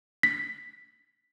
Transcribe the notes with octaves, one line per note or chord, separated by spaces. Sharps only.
B6